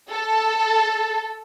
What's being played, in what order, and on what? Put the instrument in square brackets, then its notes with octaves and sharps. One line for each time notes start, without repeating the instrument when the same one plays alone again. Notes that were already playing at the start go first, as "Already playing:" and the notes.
[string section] A4